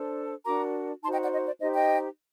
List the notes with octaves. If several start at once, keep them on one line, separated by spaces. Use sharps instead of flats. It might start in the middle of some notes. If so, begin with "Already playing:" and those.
Already playing: D4 A4 C5
D4 F#4 A#4 A#5 D6
D#4 F#4 C5 A5 C6
D#5 G5
D5 F#5
D#5
D5
D#4 G4 C5 D#5
D#5 G5